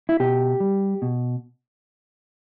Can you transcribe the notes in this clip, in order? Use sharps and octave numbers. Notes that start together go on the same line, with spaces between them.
E4
B2 G4
G3
B2